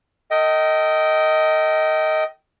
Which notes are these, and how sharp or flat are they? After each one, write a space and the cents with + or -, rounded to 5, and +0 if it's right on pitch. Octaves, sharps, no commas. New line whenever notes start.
A4 +35 D#5 +15 G5 -20